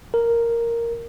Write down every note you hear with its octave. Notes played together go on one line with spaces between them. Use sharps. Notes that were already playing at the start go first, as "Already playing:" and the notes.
A#4